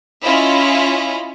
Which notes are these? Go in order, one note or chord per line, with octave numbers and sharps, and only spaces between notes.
C#4 E4 F4 D#5 B5